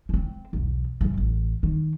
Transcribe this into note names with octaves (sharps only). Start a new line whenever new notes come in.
C4 C#4
B1 E2
G2 C#3
A1
D#3